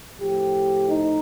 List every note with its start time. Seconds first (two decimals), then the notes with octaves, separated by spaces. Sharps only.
0.19 A2 F3 G4
0.88 D#4